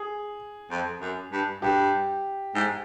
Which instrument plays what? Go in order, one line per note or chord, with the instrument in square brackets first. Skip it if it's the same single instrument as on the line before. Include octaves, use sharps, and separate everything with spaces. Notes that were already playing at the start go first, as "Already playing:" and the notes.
Already playing: [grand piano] G#4
[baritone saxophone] F2
F#2
G2
[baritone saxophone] G2 [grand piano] G4
[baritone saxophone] G#2